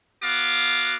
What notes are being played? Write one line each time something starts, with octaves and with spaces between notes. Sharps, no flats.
B3 F#4 F5 D6